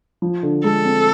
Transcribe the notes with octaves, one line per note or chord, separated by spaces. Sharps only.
F3
D3
G#3 A4
C4